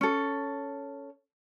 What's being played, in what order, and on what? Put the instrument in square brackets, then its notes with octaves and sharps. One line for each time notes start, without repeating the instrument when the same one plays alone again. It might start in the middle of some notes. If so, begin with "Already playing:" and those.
[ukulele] C#4 A4